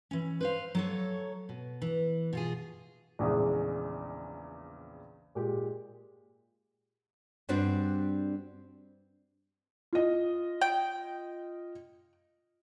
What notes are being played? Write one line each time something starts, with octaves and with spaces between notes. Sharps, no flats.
E3 C#4
B4 C5 F5
F#3 A4 C#5
B2
E3
B2 F4 G#4
A#1 E2 C#3 G#3 D#6
A#2 G#3 G4
G2 G3 C4 D4 F#4 D5
F4 D#5
G5